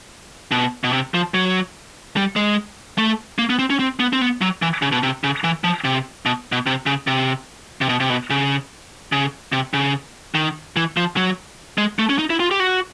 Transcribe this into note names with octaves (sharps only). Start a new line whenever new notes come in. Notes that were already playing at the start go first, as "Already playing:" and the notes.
B2
B2
C3
F3
F#3
G3
G#3
A3
A#3
B3
C4
C#4
C4
B3
C4
B3
F#3
E3
C#3
B2
C3
C#3
E3
F3
C3
B2
B2
C3
C#3
C3
C3
B2
C3
B2
C#3
C#3
C3
C#3
D#3
E3
F3
F#3
G#3
A3
C#4
D#4
E4
F4
G4
F#4